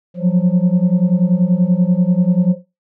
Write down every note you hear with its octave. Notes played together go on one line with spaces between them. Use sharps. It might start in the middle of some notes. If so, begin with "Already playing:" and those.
F3 F#3